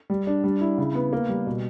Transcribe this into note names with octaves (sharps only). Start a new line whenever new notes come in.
G3
D4
G3
E4
C#3
B3
A#3
G3
B2